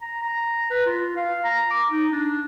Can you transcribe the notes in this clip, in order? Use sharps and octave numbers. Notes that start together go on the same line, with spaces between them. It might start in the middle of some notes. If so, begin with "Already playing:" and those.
A#5
A#5
B4
F4
F5
A#5
D6
D#4
D4